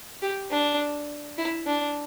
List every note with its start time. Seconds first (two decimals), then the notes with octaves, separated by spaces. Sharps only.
0.22 G4
0.51 D4
1.38 E4
1.66 D4